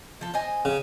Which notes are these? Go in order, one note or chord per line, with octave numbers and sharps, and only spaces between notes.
F3 A4
C5 D#5 G#5
C#3